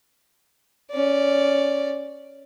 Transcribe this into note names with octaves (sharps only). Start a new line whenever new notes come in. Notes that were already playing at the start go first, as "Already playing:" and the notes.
C#4 D5